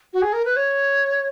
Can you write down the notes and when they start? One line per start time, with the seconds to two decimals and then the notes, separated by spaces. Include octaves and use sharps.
0.13 F#4
0.22 G#4
0.33 A#4
0.45 B4
0.56 C#5